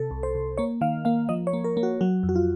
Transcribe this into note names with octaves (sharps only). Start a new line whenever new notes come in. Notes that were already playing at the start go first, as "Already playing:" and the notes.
Already playing: C3 A4
C2
C5
C2
A#3 C#5
D#3 F5
A#3 F5
F3 D#5
C#5
A#3
A#4
A#3
F#4
F#3 F#4
F2
F#4
F4